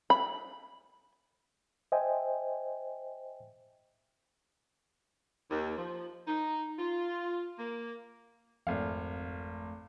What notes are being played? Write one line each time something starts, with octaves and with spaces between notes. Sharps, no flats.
B5
C5 D#5 E5 G5 G#5
D#2
F3
D#4
F4
A#3
G#1 F2 A3 F5